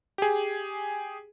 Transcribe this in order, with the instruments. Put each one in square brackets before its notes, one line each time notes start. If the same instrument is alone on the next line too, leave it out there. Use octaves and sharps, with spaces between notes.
[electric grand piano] G4 G#4